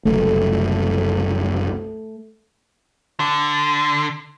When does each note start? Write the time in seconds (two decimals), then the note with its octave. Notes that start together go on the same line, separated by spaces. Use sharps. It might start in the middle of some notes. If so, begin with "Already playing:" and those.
0.06 F#1 C2 F#2 A3
3.20 D3